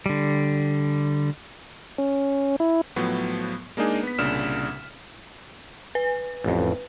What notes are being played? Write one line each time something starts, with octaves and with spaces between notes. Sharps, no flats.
D3 G3
C#4
E4
A2 F3 F#3 B3
G#3 A#3 D4 D#4 G#4
B3 B6
C2 A#2 C#3 D4 F6 E7
B4
A1 F2